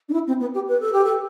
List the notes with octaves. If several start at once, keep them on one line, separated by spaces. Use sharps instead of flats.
D4
E4
C4
B3
G4
B4
A4
G4
A4